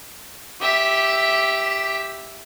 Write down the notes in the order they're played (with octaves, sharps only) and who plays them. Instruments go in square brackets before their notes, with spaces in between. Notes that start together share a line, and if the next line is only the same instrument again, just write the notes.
[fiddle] G4 E5